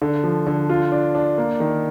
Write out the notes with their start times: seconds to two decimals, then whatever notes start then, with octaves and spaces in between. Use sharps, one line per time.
0.02 D3
0.24 F3
0.47 D3
0.69 F4
0.92 D4
1.15 D4
1.38 A#3
1.60 D#3